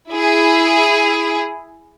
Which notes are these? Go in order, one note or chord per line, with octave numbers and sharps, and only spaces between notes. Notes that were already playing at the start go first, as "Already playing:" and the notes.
E4 G#4